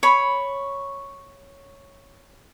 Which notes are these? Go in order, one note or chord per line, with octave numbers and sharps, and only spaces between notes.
C#5 B5